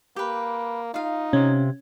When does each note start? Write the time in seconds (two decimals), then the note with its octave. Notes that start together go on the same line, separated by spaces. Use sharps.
0.16 A#3 G4 B4
0.94 D#4 F4 F5
1.33 C3 C#4